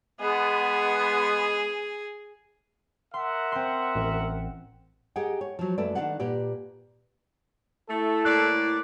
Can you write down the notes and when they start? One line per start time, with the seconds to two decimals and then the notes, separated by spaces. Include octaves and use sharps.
0.21 G#3 B3 G#4
3.14 A#4 E5 F#5 C6
3.52 C4 C6
3.95 A1
5.16 G4 G#4 A#4 D#5 F#5 G5
5.41 C#5
5.59 F3 F#3
5.78 F#2 A3 A4 B4 D5
5.95 D#3 D4 G4 D5 F5 F#5
6.20 A#2 G4 B4 D5
7.89 A3 E4 A4
8.25 A2 A#3 D5 F#6